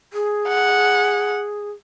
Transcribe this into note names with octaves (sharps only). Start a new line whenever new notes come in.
G#4
F#5